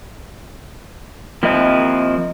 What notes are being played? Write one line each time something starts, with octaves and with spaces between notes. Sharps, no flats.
F3 A#3 C4 E4 D#5